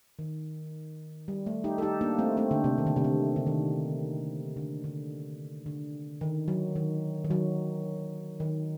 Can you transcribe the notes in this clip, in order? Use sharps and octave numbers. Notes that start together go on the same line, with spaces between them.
D#3
G3
A3
D#4 G4
A4
D#4 G4
A#3 D4
A3 C4
A3 C4
D3
C3
D#3
D3
C3
D3
D3
D#3
D3
D3
D3
D#3
F#3
D#3
D#3
F#3
D#3